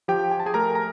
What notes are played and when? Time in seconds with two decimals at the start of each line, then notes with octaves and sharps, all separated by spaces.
0.08 F3 G4 G5
0.31 G#5
0.40 A5
0.46 G#4 G#5
0.54 A3 A#4 A#5
0.75 A#5